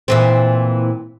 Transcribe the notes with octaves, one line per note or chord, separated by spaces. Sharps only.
A#2 E3 C4